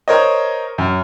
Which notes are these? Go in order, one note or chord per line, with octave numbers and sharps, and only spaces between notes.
A#4 C5 C#5 D#5
F#2